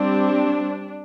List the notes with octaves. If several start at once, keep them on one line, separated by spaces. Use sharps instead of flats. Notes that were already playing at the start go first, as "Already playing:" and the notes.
Already playing: G3 C4 D4